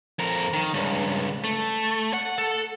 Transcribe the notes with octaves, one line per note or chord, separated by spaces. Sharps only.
F2 A#4
D#3
C#2 G2
A3
F#5
A4